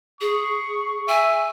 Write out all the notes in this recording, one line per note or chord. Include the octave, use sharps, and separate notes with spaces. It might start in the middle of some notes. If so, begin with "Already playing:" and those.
G#4 C#6
E5 G#5